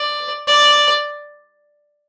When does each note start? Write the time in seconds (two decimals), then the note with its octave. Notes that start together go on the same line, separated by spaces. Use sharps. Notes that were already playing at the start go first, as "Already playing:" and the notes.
Already playing: D5
0.47 D5